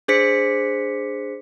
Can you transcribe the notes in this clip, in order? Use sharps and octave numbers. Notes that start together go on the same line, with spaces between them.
D4 G#4 C5 B6 C#7